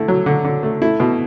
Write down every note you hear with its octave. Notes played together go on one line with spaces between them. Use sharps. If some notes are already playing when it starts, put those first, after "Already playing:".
Already playing: D3 A3 E4
F#3
D3
D3
A3
A3 E4
B2